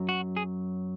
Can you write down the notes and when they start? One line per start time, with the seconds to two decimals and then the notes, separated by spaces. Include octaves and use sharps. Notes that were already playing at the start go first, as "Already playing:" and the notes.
Already playing: F#2 F#3
0.09 F#4
0.36 G#4